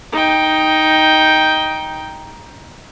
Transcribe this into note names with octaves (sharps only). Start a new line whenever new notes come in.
D#4 G5